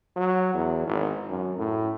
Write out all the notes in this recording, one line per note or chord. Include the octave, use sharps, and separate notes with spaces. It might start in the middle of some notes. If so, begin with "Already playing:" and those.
F#3
E2
G#1
F#2
A2